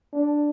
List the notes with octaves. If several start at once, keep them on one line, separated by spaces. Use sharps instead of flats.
D4